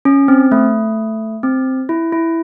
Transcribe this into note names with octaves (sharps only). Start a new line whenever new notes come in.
C#4
C4
A3
C4
E4
E4